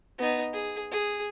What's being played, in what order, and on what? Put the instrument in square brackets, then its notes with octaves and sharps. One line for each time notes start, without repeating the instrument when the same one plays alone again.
[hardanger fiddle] B3 D#4
G#4
G#4